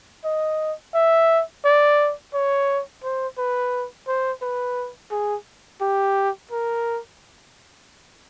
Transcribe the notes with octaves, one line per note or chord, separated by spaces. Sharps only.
D#5
E5
D5
C#5
C5
B4
C5
B4
G#4
G4
A#4